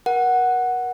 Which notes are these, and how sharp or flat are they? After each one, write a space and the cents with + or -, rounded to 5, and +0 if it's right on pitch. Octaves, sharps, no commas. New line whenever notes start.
A#4 +35 F#5 +0